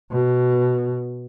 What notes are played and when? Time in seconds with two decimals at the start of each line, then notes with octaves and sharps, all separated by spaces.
0.12 B2